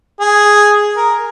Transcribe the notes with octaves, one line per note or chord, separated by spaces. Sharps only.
G#4
A#4